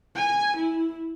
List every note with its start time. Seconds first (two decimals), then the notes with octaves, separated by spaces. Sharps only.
0.15 G#5
0.57 E4